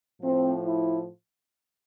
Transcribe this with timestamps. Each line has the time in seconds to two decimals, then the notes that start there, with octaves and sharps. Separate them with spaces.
0.20 A2 F3 C4
0.66 E4